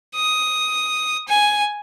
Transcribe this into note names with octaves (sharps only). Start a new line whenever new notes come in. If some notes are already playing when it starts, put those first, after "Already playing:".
D#6
G#5